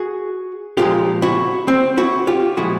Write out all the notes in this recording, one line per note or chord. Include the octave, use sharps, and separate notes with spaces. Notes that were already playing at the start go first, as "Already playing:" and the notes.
Already playing: F#4 G#4
A#2 F3 G#3 F4 G4
E4 F#4
C4
E4 F#4
F4 G4
A#2 F3 G#3 E4 F#4